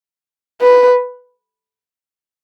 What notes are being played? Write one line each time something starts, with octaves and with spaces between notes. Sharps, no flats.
B4